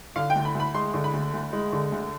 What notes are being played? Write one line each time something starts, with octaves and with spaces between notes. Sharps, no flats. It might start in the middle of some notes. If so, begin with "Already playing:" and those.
D3 F5
G5
D2
B5
D2
B5
G#3 C6
D3
B5
D2
D2
G#3
D3
D2